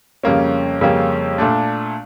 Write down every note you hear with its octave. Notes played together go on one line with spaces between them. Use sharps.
F2 C#3 G3 A#3 C#4
F2 C#3 G3 A#3 C#4
A#2 A3 D4